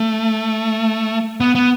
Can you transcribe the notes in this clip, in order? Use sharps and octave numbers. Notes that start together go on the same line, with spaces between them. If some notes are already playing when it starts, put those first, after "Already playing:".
Already playing: A3
B3
B3